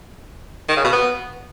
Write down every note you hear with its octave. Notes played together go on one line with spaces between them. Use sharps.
D#3
C#3
B2
B3